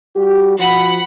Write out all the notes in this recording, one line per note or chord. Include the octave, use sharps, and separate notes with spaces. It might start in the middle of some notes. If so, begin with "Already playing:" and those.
G3 F#4 G4
F3 F#4 F#5 B5